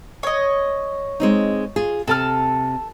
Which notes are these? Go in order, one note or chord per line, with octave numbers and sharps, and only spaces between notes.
C#5 D#5
G#3 C4 D#4
F4 G#4
C3 A4 A5 F6